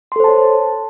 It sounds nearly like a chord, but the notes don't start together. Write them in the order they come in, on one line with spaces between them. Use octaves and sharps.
C6 A4 C5 A5 C#5